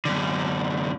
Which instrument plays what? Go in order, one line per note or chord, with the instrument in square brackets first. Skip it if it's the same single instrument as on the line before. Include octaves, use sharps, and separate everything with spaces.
[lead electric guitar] F#2 D3